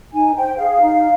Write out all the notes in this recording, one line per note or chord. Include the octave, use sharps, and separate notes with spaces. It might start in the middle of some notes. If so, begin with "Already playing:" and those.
D#4 G#5
C5 G5
G#4 F5
D#4